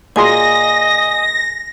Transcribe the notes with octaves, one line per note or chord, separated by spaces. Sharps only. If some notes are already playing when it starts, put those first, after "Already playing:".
A#2 G#4 D#5 G#5 C6 A#6